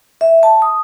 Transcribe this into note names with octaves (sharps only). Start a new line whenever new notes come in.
E5
A5
D#6